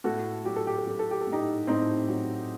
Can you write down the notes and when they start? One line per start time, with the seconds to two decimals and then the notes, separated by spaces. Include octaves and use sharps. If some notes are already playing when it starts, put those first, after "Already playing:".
0.04 A2 F#4 A4
0.45 F#3 G4
0.56 A4
0.67 G4
0.78 A4
0.86 F#3 G4
0.99 A4
1.11 G4
1.21 A4
1.27 A2
1.32 D#4 G4
1.67 A2 C4 D#4
2.08 F#3